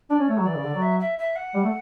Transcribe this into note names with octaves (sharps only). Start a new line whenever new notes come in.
D4 D5
C#4
A3 C#5
F#3
E3 D5
C#3
D3
F#3
E5
E5
E5
F#5
G3
A3